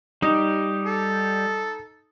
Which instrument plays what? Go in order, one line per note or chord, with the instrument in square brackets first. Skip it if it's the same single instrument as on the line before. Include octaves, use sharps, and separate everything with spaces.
[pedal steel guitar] G3 G4 [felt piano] D#4
[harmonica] A4